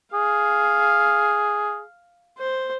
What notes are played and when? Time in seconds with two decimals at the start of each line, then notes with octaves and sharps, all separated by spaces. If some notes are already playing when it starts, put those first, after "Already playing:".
0.14 G#4 F5
2.38 C5